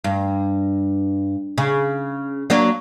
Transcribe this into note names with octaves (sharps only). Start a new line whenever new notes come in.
G2
C#3
F#3 A#3 D4